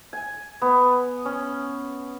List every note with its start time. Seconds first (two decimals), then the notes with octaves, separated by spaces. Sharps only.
0.13 G#5
0.62 B3
1.25 C#4